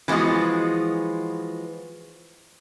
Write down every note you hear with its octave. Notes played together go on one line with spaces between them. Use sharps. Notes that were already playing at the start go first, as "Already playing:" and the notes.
E3 F3 G#3 B3 F#4